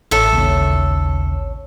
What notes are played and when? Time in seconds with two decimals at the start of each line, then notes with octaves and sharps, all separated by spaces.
0.11 A1 A4 C#5 E5
0.33 D#2 C#3